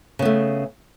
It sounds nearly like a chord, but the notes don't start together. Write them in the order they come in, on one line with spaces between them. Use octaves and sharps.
C#3 B3 A3